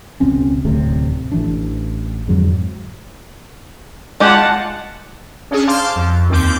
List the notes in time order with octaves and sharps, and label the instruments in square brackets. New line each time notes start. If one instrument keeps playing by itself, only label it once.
[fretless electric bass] C#2 B2 C4 C#4
D1 D2 A2 C3
A1 E3 D4
F2 G#2 D3 F#3
[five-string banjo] G#3 G4 [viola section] F4 F#5 A5
[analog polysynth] C#4 D4 G#4
C5 F5 A5 C6 D6 F6
F2
D#2 C4 D6 G6